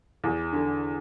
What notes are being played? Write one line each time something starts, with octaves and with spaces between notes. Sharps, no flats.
E2
D3